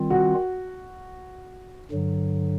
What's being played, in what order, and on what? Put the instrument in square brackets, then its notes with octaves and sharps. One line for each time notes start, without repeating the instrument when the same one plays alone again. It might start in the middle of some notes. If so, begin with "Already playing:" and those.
Already playing: [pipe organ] D#3 G3 C4 F4
[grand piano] F#4
[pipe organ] G2 D3 F#3